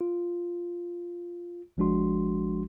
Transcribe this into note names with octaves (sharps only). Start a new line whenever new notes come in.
F4
G#1 F3 G#3 D4 F#4 C6